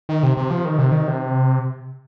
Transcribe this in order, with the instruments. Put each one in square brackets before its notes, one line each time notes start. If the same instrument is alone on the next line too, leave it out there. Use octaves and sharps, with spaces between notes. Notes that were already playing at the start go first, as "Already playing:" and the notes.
[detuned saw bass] D#3
C3
C3
F3
D#3
C3
D#3
C3